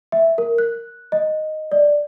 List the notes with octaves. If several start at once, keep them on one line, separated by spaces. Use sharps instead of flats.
E5
A#4
F#6
D#5
D5